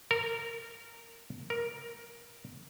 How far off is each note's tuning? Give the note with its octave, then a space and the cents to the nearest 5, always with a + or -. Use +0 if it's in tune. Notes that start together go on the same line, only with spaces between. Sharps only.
A#4 -15
A#4 +10